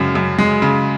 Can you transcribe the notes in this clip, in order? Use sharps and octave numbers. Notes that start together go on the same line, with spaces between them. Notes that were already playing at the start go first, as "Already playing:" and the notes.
Already playing: F#2 C#3 G#3
F#2
G#3
C#3